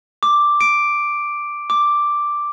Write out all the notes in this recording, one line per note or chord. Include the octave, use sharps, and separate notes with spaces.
D6
D7
D6